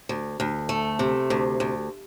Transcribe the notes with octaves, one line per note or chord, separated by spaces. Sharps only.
D2
D2
A3
C3
D2
D2